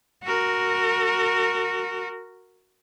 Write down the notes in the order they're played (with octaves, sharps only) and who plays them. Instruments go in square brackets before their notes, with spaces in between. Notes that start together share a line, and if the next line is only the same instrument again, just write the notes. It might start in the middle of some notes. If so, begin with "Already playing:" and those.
[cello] F#4 A#4